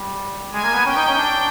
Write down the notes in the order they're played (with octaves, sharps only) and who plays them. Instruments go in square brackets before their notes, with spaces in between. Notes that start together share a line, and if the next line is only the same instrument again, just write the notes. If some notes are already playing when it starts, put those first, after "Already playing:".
Already playing: [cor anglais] G3
[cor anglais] G#3 [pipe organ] G#5
[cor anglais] A#3
B3
[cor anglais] C#4 [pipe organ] G5
[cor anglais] D#4
C#4
D4